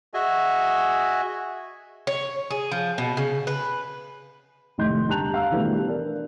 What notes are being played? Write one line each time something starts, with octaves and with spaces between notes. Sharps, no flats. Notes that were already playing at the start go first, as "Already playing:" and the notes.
F#4 G#4 D#5 E5 G#5
C#5
G#4
F3
B2
C#3
B4
F1 A2 D#3 D#5 C6 G6
D3 G3 A5 A#5 F#6 F7
F5 A#5 E6
B2 D#3 E3 G3 A3 D4
D4 A#4 D5